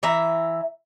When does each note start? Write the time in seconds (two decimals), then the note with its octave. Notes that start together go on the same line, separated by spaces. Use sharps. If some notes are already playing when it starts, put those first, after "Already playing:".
0.03 E3 E5 A#5